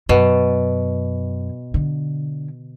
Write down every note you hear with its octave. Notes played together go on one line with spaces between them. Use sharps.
F#2 B2
D3